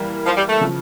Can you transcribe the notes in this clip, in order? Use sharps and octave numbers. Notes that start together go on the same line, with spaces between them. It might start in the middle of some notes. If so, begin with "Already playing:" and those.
Already playing: E3 G3 A#3
F3
G3
A3
C#3 F3